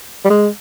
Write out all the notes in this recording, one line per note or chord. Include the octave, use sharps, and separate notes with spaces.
G3
G#3